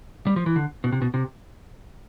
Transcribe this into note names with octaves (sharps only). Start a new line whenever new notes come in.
G3
F3
E3
D3
B2
C3
B2
C3